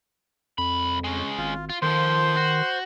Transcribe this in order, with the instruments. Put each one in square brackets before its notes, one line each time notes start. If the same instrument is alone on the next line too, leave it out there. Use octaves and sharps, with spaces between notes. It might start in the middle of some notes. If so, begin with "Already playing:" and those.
[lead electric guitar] C2 B5 [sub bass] F2
[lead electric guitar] G#3 C#4
[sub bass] G#1 [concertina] F4
[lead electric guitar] F4
[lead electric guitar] F2 F3 [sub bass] D#3 [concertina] C5 C6
[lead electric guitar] F#4